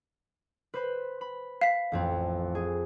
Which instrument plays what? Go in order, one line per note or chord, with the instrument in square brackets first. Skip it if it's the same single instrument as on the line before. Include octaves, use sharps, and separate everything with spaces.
[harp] B4 C5 B5
B5
[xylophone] F5 B6
[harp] A1 F2 C4
G#4